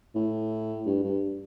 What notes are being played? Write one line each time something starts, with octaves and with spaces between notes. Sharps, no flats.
A2
G2
G2